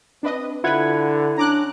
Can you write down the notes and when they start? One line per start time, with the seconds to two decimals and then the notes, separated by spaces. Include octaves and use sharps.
0.23 C4 D4 B4 D#5
0.64 D3 E4 F4 B4 F#5 G#6
1.37 C#4 D4 A#5 D6 F#6